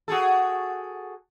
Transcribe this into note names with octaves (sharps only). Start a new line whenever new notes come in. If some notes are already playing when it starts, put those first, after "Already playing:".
F#4 G#4 A4